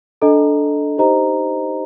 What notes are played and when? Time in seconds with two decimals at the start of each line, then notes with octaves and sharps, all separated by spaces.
0.21 D4 A4 D#5 A#5
0.97 D#4 G4 C5 D#5 A#5